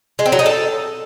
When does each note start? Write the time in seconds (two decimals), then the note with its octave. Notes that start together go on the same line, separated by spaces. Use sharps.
0.19 G#3
0.26 C4
0.32 F#3
0.39 D#4
0.46 A4